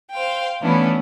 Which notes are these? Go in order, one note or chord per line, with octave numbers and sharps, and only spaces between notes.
C5 F5 G5
E3 A3 B3 C#4 D4 E4